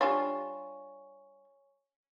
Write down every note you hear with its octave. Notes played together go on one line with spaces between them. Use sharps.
G3 D4 F4 C#5 G#5 C#6